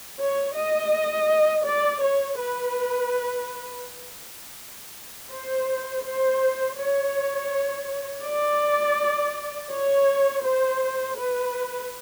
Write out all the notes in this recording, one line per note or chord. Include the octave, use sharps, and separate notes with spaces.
C#5
D#5
D5
C#5
B4
C5
C5
C#5
D5
C#5
C5
B4